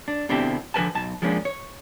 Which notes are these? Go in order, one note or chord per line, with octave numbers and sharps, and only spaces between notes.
D4
B2 D3 C4 D4 E4 G4
D3 F3 A#4 B4 G#5 A5
B1 A5
F3 G#3 A#3 C#4 D4
C#5